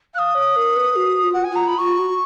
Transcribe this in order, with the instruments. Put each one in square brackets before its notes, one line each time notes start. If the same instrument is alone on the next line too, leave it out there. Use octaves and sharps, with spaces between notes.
[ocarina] F5 [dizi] D#6 F#6
[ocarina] C#5
A#4
B4
F#4
F4
[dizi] F#5
G#5
[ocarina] F4 [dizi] A#5
[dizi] B5
[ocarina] F4 [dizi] C#6
[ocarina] F#4